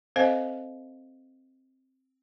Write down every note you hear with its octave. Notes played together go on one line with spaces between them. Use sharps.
C4 A4 C5 D#5 F5 G#5